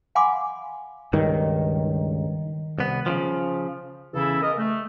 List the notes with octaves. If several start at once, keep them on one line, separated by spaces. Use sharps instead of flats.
F5 F#5 G#5 B5 C6 D6
C#2 G2 D#3
C2 B3
C#3 E3 F3
E2 C#3 E3 C#4 E4 A4
A#4 D#5
A3